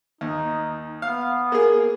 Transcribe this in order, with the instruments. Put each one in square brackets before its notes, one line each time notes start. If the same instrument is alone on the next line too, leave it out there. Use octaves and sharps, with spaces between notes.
[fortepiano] D#2 [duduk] D#4
[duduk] B3 [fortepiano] F5
[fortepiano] A#3 G#4